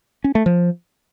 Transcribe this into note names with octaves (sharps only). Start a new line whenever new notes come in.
C#4
A3
F3